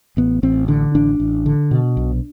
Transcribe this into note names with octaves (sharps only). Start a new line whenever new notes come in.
A1 B3
A1 C4
D3 D4
A1 D4
A1
D3
B2
B1